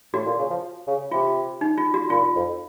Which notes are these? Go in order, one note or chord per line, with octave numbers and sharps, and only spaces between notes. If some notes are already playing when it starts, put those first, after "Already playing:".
A2 F#4
A#2
C#3
F3
C#3
C3 F4
D#4
F4
F#4
A#2 F4
F2